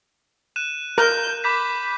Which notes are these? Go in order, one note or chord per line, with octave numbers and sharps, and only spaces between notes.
F#6 D#7 E7
A#4 G6
B5 D6 G6 B6